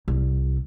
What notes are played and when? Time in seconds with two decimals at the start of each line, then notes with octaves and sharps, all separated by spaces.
0.08 C2